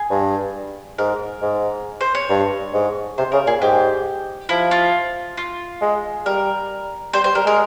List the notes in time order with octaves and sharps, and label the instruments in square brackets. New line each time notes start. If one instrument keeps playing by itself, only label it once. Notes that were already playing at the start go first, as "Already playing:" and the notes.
Already playing: [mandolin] G#4
[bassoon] G2
[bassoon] G#2 [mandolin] A#4
[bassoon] G#2
[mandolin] C5
C#5
[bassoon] G2
G#2
[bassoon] C3 [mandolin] C5
[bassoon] C#3 [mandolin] A#4
[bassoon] A#2 [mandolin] G#4
[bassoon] G#2 [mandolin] G4
[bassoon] F3 [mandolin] E4
[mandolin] F4
F4
[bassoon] G#3
[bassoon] G3 [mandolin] A#4
[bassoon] G3 [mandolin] C5
[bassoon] G3 [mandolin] C5
[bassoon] G3 [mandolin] A#4
[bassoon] G#3 [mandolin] A#4